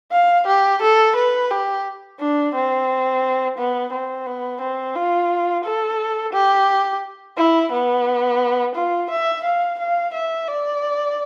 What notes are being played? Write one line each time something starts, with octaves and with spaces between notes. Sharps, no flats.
F5
G4
A4
B4
G4
D4
C4
B3
C4
B3
C4
F4
A4
G4
E4
B3
F4
E5
F5
F5
E5
D5